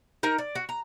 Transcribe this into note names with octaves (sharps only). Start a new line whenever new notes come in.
D#4 A#4 A#5
D5
F#4
A#5